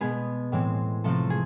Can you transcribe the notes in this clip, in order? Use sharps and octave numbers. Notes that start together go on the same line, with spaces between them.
B2 G#3 B3 G#4
A2 E3 G#3 C4
C3 F3 A3 C4 A4
G#4